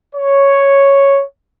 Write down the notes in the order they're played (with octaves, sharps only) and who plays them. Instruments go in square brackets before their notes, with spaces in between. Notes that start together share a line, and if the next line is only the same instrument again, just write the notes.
[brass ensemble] C#5